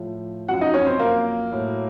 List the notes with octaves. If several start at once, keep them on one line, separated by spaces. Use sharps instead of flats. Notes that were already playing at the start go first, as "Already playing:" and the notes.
Already playing: A2 F3
F#2 F3 F#4 F#5
D#4 D#5
C#4 C#5
C4 C5
A#3 A#4
A2 F#3